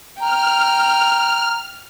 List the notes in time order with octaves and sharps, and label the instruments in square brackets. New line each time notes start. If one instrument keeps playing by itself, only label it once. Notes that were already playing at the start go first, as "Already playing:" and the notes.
[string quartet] G5 [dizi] A#5 [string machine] F6